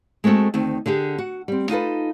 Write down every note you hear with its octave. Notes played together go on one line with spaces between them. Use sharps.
G#3 A3 C4 F#4 A4
D2 D#3 C4
D3 D4 G4 G#4
F#4 F#5
G3 C4
D#4 F4 A4 B4